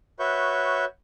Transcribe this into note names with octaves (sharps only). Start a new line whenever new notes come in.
F#4 B4 C#5 E5 C#6 G6